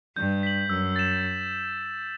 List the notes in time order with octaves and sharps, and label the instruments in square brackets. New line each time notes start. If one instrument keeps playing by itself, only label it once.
[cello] G2 [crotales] G6
[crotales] B6 F#7
[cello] F#2 [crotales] E6
[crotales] A6 E7